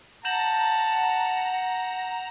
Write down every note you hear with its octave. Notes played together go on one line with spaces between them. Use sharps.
F#5 A5 A#5 G6 E7 F#7